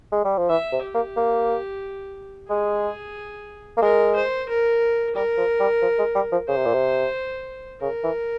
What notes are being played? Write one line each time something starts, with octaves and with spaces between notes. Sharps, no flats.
G#3
G3
F3
E3 E5
C3
G4
A#3
A#3
G#3 G#4
A#3
G#3 A#4
C5
A#4
G3 A#4
F3
G3
F3
G#3
G3
F3
C#3 C5
C3
A#2
C3
C#3 A#4
E3